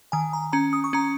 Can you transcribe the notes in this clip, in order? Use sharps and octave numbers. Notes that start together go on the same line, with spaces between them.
D#3 G#5
A#5
C#4 A#5
D#6
C#6
C#4 A#5